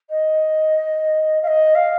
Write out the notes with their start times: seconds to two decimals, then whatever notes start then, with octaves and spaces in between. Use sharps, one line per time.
0.10 D#5
1.42 F5
1.47 D#5
1.75 F5